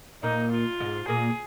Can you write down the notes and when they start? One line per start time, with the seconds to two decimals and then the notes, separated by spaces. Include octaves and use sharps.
0.23 A#2 A#3 D#4
0.51 F4
0.80 G#2 G#3
1.08 A#2 A#3 G#4